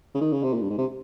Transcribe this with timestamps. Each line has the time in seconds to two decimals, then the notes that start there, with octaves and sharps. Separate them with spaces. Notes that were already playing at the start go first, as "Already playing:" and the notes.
0.14 C#3
0.21 D#3
0.33 C#3
0.43 C3
0.54 A#2
0.62 G2
0.70 G#2
0.78 C3